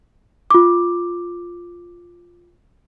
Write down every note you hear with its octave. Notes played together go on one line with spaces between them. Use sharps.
F4 D6